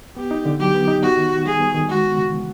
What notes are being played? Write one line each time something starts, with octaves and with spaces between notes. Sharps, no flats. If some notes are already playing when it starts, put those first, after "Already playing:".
B3 G4
D#4
D3
F#3 G4
B3
D#4
B3 F#4
D#3
D#3
G3 G#4
B3
D#3
G#3 F#4
B3
C#3
E3